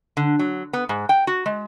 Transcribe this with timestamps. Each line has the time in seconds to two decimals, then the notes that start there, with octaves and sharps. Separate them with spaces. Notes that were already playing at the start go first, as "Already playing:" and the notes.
0.17 D3
0.39 F#3
0.73 B3
0.89 G#2
1.09 G5
1.27 F#4
1.46 G#3